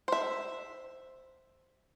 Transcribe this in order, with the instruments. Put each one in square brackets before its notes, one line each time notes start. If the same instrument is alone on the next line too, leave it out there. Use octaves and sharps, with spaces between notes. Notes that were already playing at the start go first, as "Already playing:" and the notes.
[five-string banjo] C5 E5